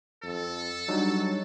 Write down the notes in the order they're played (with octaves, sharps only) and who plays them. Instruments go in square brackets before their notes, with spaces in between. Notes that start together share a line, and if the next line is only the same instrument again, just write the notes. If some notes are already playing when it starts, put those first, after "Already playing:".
[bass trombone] F2 [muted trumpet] A4
[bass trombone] F#3 [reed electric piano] G3 D4 D#4